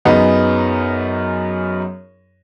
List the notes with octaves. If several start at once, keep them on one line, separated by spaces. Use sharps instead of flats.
F#2 B3 D#4 G#4